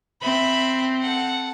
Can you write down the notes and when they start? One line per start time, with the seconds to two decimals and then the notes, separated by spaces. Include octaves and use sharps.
0.22 C4 E5 B5
1.02 A4 F#5